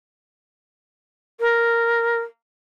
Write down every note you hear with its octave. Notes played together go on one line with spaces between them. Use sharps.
A#4